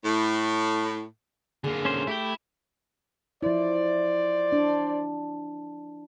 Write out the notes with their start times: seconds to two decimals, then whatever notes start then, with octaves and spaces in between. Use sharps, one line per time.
0.05 A2
1.64 D3 A#3 G#4
1.85 C#4 C5
2.07 A3 E4 G4 G5
3.43 F3 E4 C5 D5
4.52 D4